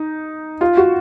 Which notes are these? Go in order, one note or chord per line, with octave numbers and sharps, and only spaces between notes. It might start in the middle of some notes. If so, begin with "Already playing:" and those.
Already playing: D#4
F4
F#4